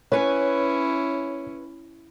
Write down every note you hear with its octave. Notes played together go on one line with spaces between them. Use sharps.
C#4 E4 B4 C#5 G#5